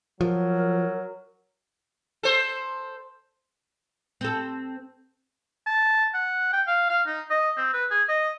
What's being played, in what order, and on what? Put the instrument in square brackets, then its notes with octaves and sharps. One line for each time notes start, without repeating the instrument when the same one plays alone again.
[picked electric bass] F3 [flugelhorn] F#3 [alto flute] A#4
[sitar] A4 C5
[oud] C4 A4
[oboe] A5
F#5
G5
F5
F5
D#4
D#5
C4
B4
G#4
D#5